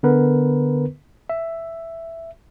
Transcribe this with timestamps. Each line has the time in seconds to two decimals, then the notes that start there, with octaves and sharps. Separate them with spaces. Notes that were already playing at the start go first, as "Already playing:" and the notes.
0.03 D3 B3 A#4 B4
1.30 E5